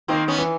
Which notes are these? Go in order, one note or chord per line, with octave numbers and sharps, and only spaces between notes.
D#3 A#3 C4
B3 C#4
E3